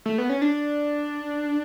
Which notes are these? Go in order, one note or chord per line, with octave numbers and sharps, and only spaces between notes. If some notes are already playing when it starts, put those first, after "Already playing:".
A3
B3
C#4
D4